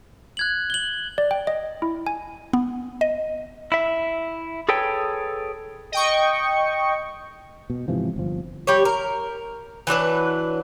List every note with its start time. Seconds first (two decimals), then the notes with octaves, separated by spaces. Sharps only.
0.37 F#6 G#6 F#7
0.70 F#7 G7
1.18 D5
1.31 G5
1.47 D#5
1.82 E4
2.07 G#5
2.53 B3
3.01 D#5
3.72 E4 E5
4.69 G#4 A4 B4 C#5 G5
5.92 D#5 G5 C#6
7.70 B2
7.88 G#2 C3 E3 F3
8.16 G1 F3
8.67 G3 G4 C#5
8.85 A#4
9.87 E3 F#3 D4 B4